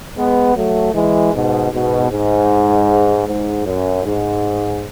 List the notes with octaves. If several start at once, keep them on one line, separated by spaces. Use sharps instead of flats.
G#3 B3
F#3 A3
E3 G#3
G#2 B2
G#2 B2
G#2
G#2
F#2
G#2